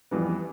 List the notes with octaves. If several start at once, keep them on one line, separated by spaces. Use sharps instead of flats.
F2 E3 G3 B3